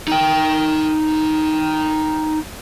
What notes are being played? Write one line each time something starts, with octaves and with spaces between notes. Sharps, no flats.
D#4 G5